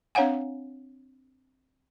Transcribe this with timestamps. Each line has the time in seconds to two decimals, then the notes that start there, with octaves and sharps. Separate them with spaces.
0.15 C4 D4 C#5 F5 F#5 G#5